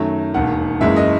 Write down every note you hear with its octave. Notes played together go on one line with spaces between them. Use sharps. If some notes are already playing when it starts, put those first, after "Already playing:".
Already playing: F#2 D#3 F#3 A3
E1 D#2 D#3 F#5
F#1 F#2 E3 G#3 E5
D#5